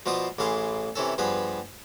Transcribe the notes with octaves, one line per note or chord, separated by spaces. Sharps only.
B2 F3 F4 D5 D#6
A1 E3 G#4 F5 C6
C3 E3 C#4 A4
G2 F3 B3 G#4 B4